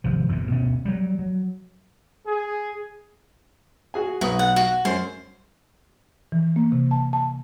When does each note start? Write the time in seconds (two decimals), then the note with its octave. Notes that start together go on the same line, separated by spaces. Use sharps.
0.04 G#1 C3 F3
0.28 G1 E2 C3 E3
0.50 D2 B2 C#4
0.85 F#3 G3
1.19 F#3
2.25 G#4
3.94 F#4 G#4 G#5
4.21 B1 F#4 B4 D#6
4.39 F#5
4.56 F#4
4.85 F#2 C5
6.32 E3
6.56 A#3
6.72 C3
6.91 A5
7.13 A5